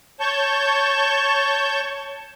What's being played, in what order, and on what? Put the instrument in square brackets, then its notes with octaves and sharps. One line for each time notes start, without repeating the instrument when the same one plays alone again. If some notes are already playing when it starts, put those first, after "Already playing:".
[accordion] C#5 A5 C#6 G6